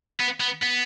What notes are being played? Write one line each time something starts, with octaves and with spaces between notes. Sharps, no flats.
B3
B3
B3